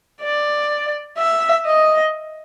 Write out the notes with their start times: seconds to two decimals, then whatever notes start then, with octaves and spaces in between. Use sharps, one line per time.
0.22 D5
1.18 E5
1.66 D#5